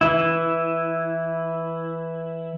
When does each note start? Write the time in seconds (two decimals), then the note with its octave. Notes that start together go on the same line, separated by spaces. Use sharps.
0.01 E3 E4